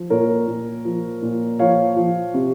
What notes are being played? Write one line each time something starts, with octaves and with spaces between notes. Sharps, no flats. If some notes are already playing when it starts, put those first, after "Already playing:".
Already playing: F3
A#2 A#4 C#5
A#2
F3
A#2
F3 C#5 F5
F3
C3